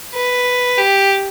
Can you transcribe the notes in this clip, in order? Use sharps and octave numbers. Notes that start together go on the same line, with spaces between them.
B4
G4